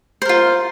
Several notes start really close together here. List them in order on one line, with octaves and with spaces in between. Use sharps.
C5 A#4 F4